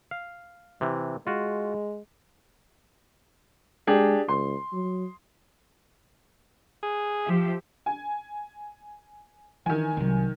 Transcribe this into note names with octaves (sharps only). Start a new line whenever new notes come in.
F5
C3 E3
G#3 F4 F#4
G#3 D4 G4 G#4
C#2 C6
F#3
G#4
F3 G4 E5
G#5
D#3 E3 G#5
C2 F#3